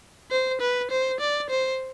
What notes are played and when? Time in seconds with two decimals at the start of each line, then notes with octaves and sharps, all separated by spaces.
0.31 C5
0.61 B4
0.91 C5
1.20 D5
1.50 C5